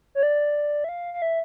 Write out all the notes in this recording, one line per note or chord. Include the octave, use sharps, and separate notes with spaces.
C#5
D5
E5
F5
F5
E5